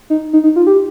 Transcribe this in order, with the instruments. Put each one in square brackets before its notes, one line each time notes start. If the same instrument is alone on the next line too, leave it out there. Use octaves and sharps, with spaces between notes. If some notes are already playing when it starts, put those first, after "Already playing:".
[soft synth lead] D#4
D#4
D#4
F4
G4